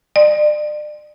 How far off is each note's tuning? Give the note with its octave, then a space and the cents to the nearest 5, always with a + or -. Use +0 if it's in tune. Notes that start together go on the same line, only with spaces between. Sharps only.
D5 +35